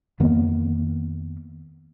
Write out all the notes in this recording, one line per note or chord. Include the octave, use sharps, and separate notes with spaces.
F2 D#3 A#3 B3